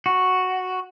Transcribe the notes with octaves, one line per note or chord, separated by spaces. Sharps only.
F#4